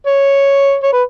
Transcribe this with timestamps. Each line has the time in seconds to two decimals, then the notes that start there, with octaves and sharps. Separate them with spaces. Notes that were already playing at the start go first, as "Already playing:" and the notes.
0.06 C#5
0.83 C#5
0.93 B4